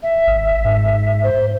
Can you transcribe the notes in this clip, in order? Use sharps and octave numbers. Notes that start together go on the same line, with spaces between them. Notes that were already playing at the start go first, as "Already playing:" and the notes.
E5
G#1
G#2
C5